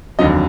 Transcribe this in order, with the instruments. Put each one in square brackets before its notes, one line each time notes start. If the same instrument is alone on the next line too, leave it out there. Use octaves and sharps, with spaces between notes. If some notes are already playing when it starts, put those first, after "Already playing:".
[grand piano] F1 D#2 D3 F#3 D#5